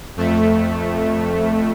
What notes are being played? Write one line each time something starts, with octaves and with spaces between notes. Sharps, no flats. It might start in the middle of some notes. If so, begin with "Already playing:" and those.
F2 A3